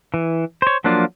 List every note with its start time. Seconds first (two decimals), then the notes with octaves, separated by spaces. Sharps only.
0.14 E3
0.62 C5 C#5
0.84 F3 F#3 A#3 D4 F4